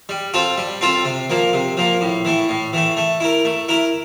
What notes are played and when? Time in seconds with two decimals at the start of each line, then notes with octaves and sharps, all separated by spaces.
0.09 G3
0.34 C4 F4 A4
0.58 G3
0.81 C4 F4 A4
1.05 C3
1.30 F3 A#3
1.53 C3
1.77 F3 A#3
2.01 A2
2.25 E3 A3
2.49 A2
2.73 E3 A3
2.97 A3
3.20 E4 A#4
3.45 A3
3.69 E4 A#4